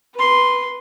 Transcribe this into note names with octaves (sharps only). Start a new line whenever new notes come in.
B4 C6